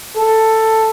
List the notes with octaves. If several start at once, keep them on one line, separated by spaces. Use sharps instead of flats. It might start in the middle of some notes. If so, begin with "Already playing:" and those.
A4